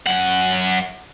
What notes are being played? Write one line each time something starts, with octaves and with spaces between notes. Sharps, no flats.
F#2 F#5